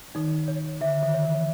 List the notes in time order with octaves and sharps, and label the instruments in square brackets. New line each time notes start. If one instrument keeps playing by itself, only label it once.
[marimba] D#3 [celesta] D#4
[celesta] C#5
[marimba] D3 [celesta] E5
[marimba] D#3
[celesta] C#5
[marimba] E3